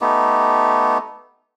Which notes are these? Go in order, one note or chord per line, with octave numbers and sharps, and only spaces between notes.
A3 B3 D#4 G4